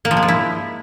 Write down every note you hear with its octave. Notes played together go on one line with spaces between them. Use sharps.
A#3
F3
G#3
F3
E4